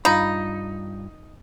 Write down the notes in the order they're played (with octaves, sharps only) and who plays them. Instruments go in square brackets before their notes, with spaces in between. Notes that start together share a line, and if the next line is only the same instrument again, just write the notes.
[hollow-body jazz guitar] G2 F4 B5 [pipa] D#4